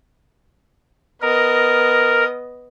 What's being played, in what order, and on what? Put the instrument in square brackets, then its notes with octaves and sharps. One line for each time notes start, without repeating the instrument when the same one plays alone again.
[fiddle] B3 D#5 [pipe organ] A#4